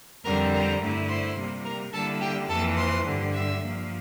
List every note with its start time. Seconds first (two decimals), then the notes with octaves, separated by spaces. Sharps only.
0.25 F2 D3 G3 C4 A#4 A#5
0.53 A#4 A#5
0.81 G2 D3 A3 E4
1.09 C5 C6
1.37 C3 G3 A#3
1.65 A#4 A#5
1.93 D3 G3 A#3 E4 A4 A5
2.21 G4 G5
2.49 F2 E3 A#3 A4 A5
2.78 C5 C6
3.05 G2 D3 G3
3.33 E5 E6
3.62 G2 F3 A#3